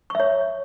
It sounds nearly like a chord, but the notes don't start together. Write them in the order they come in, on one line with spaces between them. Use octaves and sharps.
C#6 E5 C#5